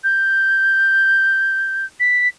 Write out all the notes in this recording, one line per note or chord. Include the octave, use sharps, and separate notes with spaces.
G6
B6